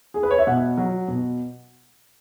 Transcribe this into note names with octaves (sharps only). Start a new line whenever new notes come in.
G#4
B4
C#5
E5
B2 F#5
F#3
B2